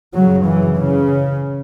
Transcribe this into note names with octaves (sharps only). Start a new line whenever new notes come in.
F#2 C#3 F#3
E3
C#3